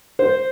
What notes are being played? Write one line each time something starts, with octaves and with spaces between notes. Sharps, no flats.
C5